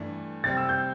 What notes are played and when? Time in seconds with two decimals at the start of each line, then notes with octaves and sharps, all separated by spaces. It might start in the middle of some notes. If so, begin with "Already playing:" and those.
Already playing: G2 E3 A3 D4 A4
0.44 C3 G3 C4 A6
0.57 E6
0.69 G6